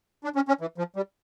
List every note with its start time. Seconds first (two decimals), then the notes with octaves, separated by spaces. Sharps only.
0.24 D4
0.35 C#4
0.48 C#4
0.61 E3
0.78 F3
0.96 G3